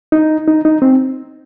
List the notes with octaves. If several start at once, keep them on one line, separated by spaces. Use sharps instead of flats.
D#4
D#4
D#4
C4